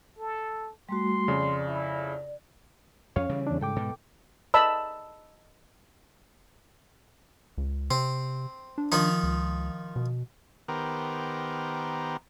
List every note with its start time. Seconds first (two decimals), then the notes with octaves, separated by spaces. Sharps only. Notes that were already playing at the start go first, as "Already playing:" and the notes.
0.19 A4
0.89 G3 A3 F#4 C6
1.28 F2 C#3 D5
1.68 E4
3.16 F2 C#4 C#5 F5
3.29 C#3 E3 G3
3.47 E2 D4
3.61 G#2 A4 G5 D6
3.76 B2
4.54 D#5 A5 B5 E6
7.58 C#2
7.91 C3 C4
8.78 D4
8.92 D#3 F3 D#4
9.23 C#2
9.96 B2
10.68 D#3 B3 G4 A#4 C5